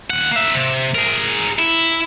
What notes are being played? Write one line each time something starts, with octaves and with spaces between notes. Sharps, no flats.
D#2 F#5
A#3 E5
C3
G#4 A#4
E4